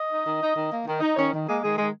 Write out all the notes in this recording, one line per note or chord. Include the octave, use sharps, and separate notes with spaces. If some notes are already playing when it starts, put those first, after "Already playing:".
Already playing: D#5
D#4
D#3
D#4
D#3
A#3
D#3
D#4
D#3 C#4 C#5
D#3
G#3 A#3 G#4
D#3 G#3 G#4
D#3 G#3 G#4